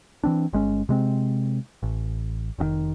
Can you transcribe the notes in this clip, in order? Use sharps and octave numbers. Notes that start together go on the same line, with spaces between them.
E3 C4 D4
G1 G#3 C#4
C3 G#3 C4
A1
F1 B2 D#3